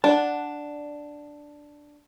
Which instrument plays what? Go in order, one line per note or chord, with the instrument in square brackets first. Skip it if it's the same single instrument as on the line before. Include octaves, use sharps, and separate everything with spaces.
[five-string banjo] D4 [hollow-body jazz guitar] D5 F#5 A5